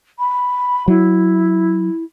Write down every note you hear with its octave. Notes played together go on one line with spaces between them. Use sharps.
B5
F#3 E4